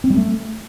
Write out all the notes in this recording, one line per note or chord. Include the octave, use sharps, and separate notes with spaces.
C4
G3
A3